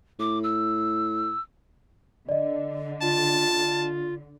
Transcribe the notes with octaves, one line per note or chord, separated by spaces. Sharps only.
A2 D6
E6
D3 D5 D#5
F4 A5